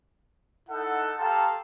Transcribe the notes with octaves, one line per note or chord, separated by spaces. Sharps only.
D#4 E4 A4 F#5
G4 A4 F5 A5 A#5 C6